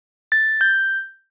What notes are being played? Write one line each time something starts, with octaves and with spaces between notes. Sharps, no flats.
A6
G6